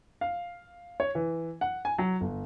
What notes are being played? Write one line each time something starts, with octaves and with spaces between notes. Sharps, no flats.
F5
C#5
E3
F#5
G#5
F#3
G1